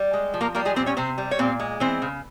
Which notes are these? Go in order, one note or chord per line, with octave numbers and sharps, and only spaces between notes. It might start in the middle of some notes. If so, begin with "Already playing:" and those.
Already playing: G3
G#3
F3
A#3 A#4
G3 A#3 A#4
G#3 G#4
A#2 C4 C5
C#4 C#5
C3 C4 C5
G3
C#5
A#2 C4 C5
G#3
E3 C4 C5
C#3